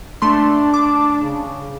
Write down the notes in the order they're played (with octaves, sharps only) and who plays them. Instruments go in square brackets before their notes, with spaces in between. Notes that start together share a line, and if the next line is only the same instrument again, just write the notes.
[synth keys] A3 C6 [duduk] D4
[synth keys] D6
[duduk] C#3